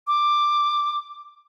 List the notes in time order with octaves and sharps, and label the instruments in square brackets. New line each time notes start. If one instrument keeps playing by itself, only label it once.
[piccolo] D6